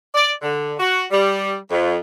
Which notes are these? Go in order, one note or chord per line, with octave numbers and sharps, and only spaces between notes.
D5
D3
F#4
G3
F2